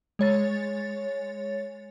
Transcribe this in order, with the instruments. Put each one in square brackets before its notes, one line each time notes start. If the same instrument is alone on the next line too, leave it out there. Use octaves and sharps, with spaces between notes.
[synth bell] G#3 C#5 A6